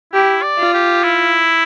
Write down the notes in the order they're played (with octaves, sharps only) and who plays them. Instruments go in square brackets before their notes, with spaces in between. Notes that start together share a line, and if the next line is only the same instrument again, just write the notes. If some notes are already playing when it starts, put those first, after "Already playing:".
[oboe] E4 [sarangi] G4
[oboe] D5
[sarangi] F4
[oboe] G4
E4